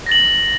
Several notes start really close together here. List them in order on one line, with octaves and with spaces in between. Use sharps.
A#6 A6 F#7